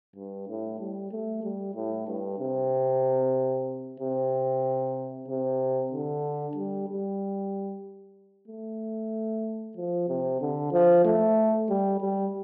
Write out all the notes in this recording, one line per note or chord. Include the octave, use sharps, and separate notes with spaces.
G2
A2
G3
A3
G3
A2
G2
C3
C3
C3
D3
G3
G3
A3
F3
C3
D3
F3
A3
G3
G3